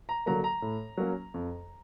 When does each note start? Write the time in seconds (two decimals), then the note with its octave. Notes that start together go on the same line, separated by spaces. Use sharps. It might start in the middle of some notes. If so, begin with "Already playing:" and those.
0.09 A#5
0.26 D3 F#3 A#3 A#5
0.44 A#5
0.62 A2
0.97 F#3 A#3 C#4
1.34 F2